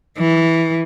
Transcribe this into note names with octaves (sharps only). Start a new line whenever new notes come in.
E3